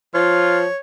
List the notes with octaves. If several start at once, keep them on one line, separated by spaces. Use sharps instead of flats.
F3 F4 C#5